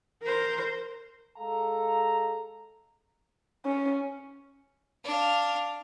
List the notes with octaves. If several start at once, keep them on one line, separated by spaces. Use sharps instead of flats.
A#4 C5
G#3 A4 F5 A#5
C#4
D4 F5